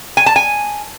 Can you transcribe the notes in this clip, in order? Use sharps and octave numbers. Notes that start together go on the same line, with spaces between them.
G#5
A5
G#5